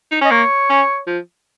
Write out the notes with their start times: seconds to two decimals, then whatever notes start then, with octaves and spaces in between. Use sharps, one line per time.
0.11 D#4
0.21 C#4 D#5
0.31 A#3 C#5
0.70 C#4
1.07 F3